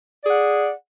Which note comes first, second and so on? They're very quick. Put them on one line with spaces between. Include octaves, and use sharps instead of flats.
D5 G#4 F#5